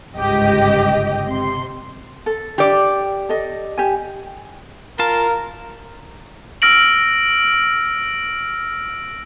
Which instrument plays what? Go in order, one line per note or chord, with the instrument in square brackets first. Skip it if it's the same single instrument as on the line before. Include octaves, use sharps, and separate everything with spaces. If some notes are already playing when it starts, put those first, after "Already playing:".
[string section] G1 C#2 G#2 G4 D#5
C3 C6
[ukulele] A4
[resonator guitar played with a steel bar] G4 D5
[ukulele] A4 D#5
G4 G#5
[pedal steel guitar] F4 A5 [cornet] A#4
[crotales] E6 F6 A#6 D7 F#7